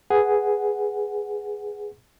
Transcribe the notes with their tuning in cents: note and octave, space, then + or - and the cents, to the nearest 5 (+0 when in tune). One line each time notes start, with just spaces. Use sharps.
G#4 +0 B4 +0 F#5 +0